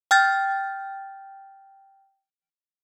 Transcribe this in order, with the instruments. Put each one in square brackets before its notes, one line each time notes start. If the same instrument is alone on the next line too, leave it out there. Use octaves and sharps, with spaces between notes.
[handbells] G5 F6 G6 A6